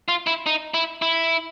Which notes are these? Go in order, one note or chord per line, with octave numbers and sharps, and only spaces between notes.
F4
E4
D#4
E4
E4